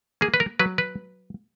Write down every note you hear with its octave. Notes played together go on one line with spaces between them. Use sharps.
A#3 G#4
B4
A#4
F#3 B4
B4